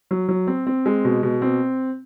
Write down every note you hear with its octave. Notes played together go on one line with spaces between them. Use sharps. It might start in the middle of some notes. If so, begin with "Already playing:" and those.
F#3
F#3
C4
C4
G#3
B2
B2
C4